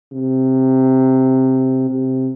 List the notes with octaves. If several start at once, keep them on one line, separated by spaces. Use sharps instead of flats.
C3
C3